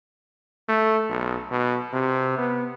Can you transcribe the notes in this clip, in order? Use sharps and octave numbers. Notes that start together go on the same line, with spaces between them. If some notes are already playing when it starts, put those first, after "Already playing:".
A3
B1
B2
C3
B3